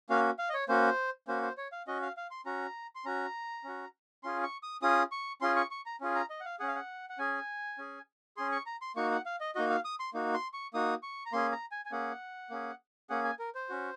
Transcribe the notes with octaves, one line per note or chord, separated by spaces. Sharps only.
A#3 C#4 F#4 F5
F5
D#5
C#5
A#3 C#4 F#4 C5
A#3 C#4 F#4 C5
C5
C#5
F5
C#4 F#4 D#5
F5
F5
C6
C#4 F#4 A#5
C6
C#4 F#4 A#5
C#4 F#4
C#4 F4 G#4 C6
C#6
D#6
C#4 F4 G#4 D#6
C#6
C#4 F4 G#4 C6
C#6
C#6
A#5
C#4 F4 G#4
A#5
D#5
F#5
F5
C#4 G#4 F#5
F5
F#5
F#5
C#4 G#4 G#5
C#4 G#4
C#4 G#4 C6
C#6
A#5
C6
A#3 D#4 F#4 C#6
F#5
F5
D#5
A#3 D#4 F#4 D#5
F5
D#6
C6
A#3 D#4 F#4
C6
C#6
A#3 D#4 F#4 D#6
C#6
A#5
A#3 C#4 G#4 C6
A#5
G#5
G#5
A#3 C#4 G#4 F#5
A#3 C#4 G#4
A#3 C#4 G#4 F#5
G#5
A#4
C5
C#4 F#4